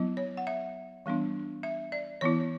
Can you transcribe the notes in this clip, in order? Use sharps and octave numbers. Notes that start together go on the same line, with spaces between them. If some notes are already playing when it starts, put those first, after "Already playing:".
Already playing: F#3 B3 E4
C#5
F#5
E5
E3 G3 B3 D4
E5
D5
E3 B3 E4 C#5